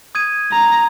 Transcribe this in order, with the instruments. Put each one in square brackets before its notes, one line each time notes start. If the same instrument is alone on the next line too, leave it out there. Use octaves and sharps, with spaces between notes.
[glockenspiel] D#6 G#6 D#7
[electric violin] A#5